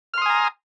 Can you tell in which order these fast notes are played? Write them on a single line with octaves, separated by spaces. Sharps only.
F6 C6 D#6 G#5 A#5